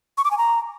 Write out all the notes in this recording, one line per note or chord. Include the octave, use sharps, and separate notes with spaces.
C#6
D6
G#5
A#5